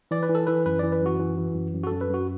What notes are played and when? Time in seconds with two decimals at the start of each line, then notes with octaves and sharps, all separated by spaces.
0.11 E3 D5
0.23 B4
0.29 E3
0.35 A4
0.47 E3 B4
0.66 F#2 B4
0.79 E3 D5
0.92 B4
1.02 F#2 F#4
1.20 E3
1.37 E3
1.55 F#2
1.74 F#2
1.83 F#4
1.87 F#2 A4
2.01 B4
2.09 F#2 F#4